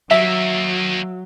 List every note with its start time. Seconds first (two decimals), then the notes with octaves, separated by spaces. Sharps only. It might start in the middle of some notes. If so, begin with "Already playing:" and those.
0.11 D#3 F#3 A#3 E5